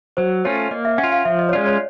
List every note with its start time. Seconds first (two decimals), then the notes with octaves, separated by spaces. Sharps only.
0.17 F#3 C5
0.45 A3 C#4 F4 C#5
0.71 A#3 D#5
0.85 E5
0.98 C#4 F#5
1.03 F4
1.13 F5
1.25 F3 E5
1.39 D#5
1.49 C#5
1.53 G#3 C#4 F4 D5
1.67 C#5